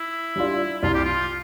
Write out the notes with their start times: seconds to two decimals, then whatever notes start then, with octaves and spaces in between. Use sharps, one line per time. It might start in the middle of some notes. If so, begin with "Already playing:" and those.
Already playing: E4
0.36 G3 D4 F4
0.83 C2 F4
0.94 G4
1.05 F4